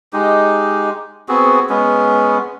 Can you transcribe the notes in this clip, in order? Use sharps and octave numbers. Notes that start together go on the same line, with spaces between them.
G#3 D#4 G4
B3 C4 F#4 G#4
G#3 B3 C#4